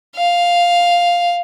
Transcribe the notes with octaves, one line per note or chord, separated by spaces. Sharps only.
F5